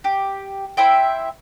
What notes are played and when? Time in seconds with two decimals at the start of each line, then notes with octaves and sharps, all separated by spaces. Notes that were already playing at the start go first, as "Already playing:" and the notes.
0.04 G4
0.77 E4 C5 E5 G5